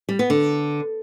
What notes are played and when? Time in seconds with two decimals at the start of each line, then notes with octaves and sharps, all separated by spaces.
0.09 G3
0.19 B3
0.30 D3